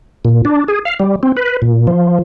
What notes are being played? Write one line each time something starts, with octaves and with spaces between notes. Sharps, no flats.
A#2
D4
G#4
F5
G3
C4
B4
A#2
F3